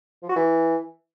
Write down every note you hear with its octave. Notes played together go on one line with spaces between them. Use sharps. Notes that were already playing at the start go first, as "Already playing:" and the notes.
F3
F#4
E3